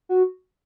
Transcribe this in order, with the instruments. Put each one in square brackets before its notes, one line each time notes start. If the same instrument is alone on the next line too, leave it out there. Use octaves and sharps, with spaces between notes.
[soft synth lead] F#4